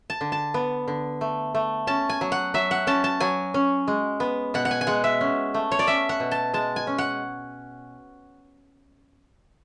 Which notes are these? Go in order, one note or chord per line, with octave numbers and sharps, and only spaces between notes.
A5
D3
A5
B3
D3
A3
A3
C#4 A5
G#5
F#3
F#5
F#3 E5
F#5
C#4 A5
A5
F#3 G#5
C#4
G#3
B3
B2 F#5
F#5
G#5
G#5
G#3 F#5
E5
C#4
A3
C#5
D5
C#4 E5
F#5
B2
A5
G#3 A5
G#5
C#4
F#5